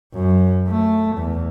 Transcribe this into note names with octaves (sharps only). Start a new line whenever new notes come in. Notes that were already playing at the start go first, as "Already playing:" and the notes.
F#2
A3
E2